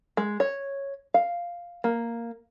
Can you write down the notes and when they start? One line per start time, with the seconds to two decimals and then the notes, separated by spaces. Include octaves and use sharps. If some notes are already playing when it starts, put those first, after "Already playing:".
0.17 G#3
0.40 C#5
1.14 F5
1.84 A#3